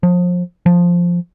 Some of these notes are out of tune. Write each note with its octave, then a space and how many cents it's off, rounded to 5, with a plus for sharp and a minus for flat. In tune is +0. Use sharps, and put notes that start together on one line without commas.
F3 +30
F3 +0